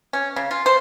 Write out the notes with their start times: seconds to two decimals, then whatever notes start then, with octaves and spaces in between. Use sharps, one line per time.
0.13 C#4
0.36 C#3
0.51 F4
0.66 C5